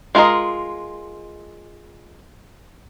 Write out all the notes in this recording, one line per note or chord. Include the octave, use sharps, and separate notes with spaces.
G#3 F4 G#4 A#4 D#5